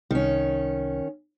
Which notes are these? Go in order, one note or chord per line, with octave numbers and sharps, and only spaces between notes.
C2 D#3 C#4